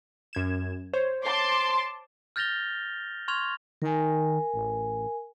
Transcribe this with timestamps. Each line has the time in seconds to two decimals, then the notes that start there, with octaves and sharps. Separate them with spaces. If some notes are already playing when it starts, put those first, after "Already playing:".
0.33 F#2 G#6 E7
0.93 C5 C#5
1.23 A5 C6 D6
2.36 F6 G6 A6 A#6 F7 G7
3.28 C6 C#6 F6 G#6 F7
3.82 D#3 A#4 G#5
4.54 A1